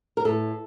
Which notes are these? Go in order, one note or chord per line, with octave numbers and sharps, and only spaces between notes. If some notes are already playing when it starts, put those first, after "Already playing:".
A#4
A2 A4